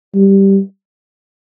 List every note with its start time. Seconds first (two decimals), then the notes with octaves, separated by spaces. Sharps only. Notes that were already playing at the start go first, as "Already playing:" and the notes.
0.15 G3